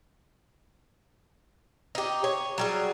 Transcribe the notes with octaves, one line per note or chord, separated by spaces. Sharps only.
D#4 G4
C#5
F#3 G3 G#4